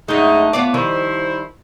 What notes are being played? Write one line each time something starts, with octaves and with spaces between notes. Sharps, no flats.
F#2 D3 G#3 A3 D#4
B3 F4 D5
D#3 F3 G3 E4 C5